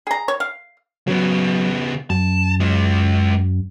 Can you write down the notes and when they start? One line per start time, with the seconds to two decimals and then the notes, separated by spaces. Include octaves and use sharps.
0.07 G#4 A#5
0.28 C#5
0.40 F5
1.07 C#3 F#3 B3
2.10 F#2 A5
2.60 G#3 F4